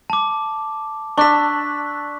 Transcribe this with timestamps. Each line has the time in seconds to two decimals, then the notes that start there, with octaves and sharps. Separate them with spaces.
0.10 A5 D6
1.18 D4 C#6 E6 F#6 B6